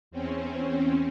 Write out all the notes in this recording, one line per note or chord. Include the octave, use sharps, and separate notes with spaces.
E2 C4 C#4